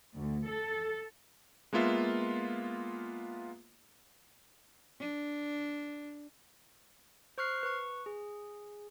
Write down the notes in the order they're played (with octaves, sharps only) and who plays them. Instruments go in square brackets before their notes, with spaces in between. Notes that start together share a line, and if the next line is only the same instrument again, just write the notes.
[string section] D2
A4
[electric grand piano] G#3 A#3 B3 F4 E5
[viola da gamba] D4
[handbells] C5 C#6 F6 F#6 C7
B4 C#6
G#4